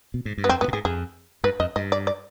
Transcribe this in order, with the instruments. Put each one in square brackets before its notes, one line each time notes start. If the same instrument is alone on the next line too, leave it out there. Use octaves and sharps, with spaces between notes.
[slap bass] B2
G#2
G2
[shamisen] B3
[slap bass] F2 [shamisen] C4
[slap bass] G2 [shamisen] B3
[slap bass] B2
[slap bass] G#2 [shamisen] G#4
[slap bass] F2 [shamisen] G#4
[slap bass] G2 [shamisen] B4
[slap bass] F2 [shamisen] D#5
[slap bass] G2 [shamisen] D#5
[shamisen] D5
D5